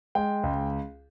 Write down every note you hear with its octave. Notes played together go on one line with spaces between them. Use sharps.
G#3 G5
C#2